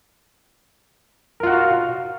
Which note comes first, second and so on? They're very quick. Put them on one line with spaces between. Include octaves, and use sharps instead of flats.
A#4 F4 F#5 F#4 F5